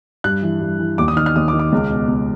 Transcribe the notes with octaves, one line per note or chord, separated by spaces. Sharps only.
G2 F#6
E3
G2
E3
D#2 D6
D#6
D#3 F6
F6
D#2 D#6
D6
D#3
D6
C#2
B2
C#2